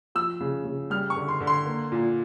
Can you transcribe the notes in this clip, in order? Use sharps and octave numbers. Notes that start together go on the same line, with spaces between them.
F3 E6
C#3
C#3
G3 F6
C#6
D3
C6
D3
C6
A#3
A#2